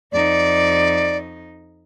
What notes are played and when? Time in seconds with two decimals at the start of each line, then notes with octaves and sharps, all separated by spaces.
0.12 F2 D#4 D5